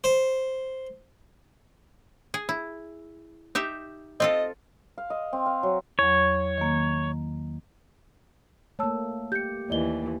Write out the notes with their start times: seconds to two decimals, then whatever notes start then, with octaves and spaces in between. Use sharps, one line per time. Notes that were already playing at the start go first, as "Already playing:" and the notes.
0.04 C5
2.34 G#4
2.49 E4
3.55 D#4 G4 E5
4.20 C4 F4 A4 D#5
4.98 F5
5.10 D#5
5.33 C4
5.46 F5
5.63 F#3
5.99 E2 F#3 C#5
6.58 D#3 A#3
8.79 A3 A#3 C#5 A5 E6
9.32 G4 G6 C#7
9.70 D#2 E3 D5 D#5 G7